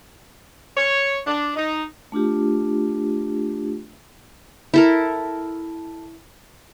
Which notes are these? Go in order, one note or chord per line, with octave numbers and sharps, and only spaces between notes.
C#5
D4
D#4
A3 D4 F4 G4
E4 A4 A#4